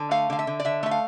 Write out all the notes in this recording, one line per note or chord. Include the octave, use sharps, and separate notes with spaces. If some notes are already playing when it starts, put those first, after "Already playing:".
Already playing: D3
A3 F5
D3 F5
E5
D3
D5
D3 E5
A3 E5
F5